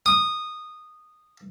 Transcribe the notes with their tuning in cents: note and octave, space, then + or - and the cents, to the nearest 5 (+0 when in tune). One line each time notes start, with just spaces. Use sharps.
D#6 -15